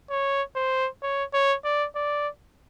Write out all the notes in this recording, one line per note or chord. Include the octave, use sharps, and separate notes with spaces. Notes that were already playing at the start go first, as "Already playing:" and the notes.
C#5
C5
C#5
C#5
D5
D5